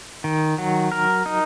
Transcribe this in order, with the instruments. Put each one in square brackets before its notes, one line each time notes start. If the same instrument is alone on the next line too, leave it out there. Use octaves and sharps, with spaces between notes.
[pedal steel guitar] D#3
F#3
A#4
D#4